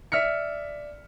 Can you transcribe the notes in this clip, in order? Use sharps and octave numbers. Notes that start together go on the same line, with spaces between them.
D5 E5 F6 B6 C#7